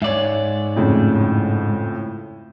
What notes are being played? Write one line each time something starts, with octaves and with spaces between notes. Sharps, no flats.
G#2 C#5 D5 E5
F2 A2 C#3